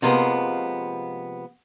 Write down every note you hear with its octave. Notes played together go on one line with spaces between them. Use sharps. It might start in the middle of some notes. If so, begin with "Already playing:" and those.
C3 F3 G#3 A#3 B3